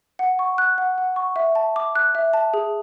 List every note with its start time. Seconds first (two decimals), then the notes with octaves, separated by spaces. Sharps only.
0.19 F#5
0.39 C#6
0.58 F#6
0.78 F#5
0.98 F#5
1.16 C#6
1.36 E5
1.55 A5
1.76 D6
1.95 F#6
2.15 E5
2.33 A5
2.54 G#4